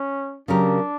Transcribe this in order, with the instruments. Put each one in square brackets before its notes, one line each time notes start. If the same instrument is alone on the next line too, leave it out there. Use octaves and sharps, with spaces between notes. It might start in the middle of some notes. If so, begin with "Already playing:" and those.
Already playing: [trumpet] C#4
[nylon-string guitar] C#3 F#3 C#4 G4 A#4 [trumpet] D4